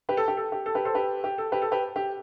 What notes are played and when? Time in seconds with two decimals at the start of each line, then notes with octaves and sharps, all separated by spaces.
0.09 G4 B4
0.17 A4
0.28 G4
0.37 A4
0.52 G4
0.66 A4
0.75 G4 B4
0.85 A4 C5
0.94 G4 B4
1.24 G4
1.38 A4
1.52 G4 B4
1.62 A4
1.72 G4 B4
1.96 G4